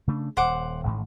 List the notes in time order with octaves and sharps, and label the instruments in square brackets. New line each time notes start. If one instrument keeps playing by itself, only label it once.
[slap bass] C#3 A3 D4
[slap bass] D#1 [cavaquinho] C5 F#5 D6
[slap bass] A1 G#2 D#3